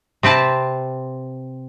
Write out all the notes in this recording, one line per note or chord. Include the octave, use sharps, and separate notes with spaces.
C3 C4 B4 A5